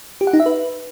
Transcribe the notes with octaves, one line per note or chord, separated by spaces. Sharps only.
G4
F#5
D#4
E5
B4